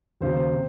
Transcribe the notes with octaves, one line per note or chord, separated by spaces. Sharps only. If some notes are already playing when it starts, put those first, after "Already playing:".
D#2 C#3 F#3 C5
C5
C3